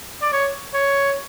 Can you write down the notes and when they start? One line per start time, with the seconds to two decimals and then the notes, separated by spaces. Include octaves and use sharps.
0.22 D5
0.33 C#5
0.74 C#5